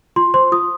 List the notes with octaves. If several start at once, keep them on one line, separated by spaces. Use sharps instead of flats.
F4 C6
C5 C6
F4 D#6